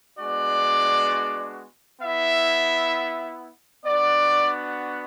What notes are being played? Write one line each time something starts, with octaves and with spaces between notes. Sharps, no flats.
G#3 B3 D4 F#4 D5
B3 E4 E5
B3 D4 F#4 D5